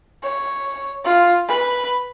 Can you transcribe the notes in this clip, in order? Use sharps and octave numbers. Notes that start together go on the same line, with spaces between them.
C#5
F4
B4